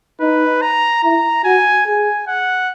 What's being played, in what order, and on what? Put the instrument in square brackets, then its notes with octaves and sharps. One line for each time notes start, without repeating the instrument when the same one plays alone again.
[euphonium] D#4 [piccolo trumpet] B4
[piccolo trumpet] A#5
[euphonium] E4 [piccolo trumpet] A#5
[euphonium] F#4 [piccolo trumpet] G#5
[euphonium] G#4 [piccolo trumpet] G#5
[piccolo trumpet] F#5